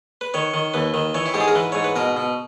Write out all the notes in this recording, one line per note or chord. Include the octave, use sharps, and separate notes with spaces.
B4
D#3 C#5
D#3
D#2 B4
D#3
E3 C#5
E4
G#2 G4
G#4
A#4
E3 B4
G#2 C#5
B4
B2 A#4
B2